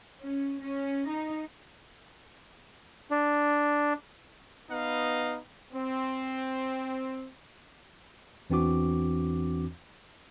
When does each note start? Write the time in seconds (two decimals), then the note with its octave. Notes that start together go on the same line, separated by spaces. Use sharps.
0.22 C#4
0.61 C#4
1.09 D#4
3.11 D4
4.70 B3 D#4 B4 D#5 F5
5.73 C4
8.50 E2 E3 C4 D4 F#4 D6